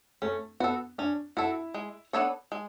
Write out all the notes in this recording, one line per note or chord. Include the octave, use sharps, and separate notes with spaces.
A3 C#4
B3 F#4 A4
C#4 D4
E4 F#4 A4
G#3
B3 D4 A4 C#5
G#3